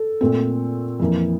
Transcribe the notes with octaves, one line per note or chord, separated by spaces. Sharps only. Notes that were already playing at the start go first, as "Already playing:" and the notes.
Already playing: A4
A#2 A3 C4
F2 E3 A#3